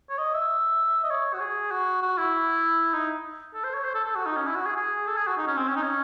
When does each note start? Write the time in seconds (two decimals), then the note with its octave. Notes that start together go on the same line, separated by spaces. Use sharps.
0.10 C#5
0.18 D#5
0.34 E5
1.04 D#5
1.10 C#5
1.34 F#4
1.41 G#4
1.71 F#4
2.02 F#4
2.18 E4
2.94 D#4
3.54 A4
3.64 C5
3.74 C#5
3.84 C5
3.95 A4
4.05 A4
4.15 F#4
4.26 D#4
4.36 C#4
4.46 E4
4.55 F#4
4.66 G#4
4.76 G#4
5.07 A4
5.16 G#4
5.27 F#4
5.38 D#4
5.47 C#4
5.57 C4
5.68 C#4
5.76 D#4
5.82 C#4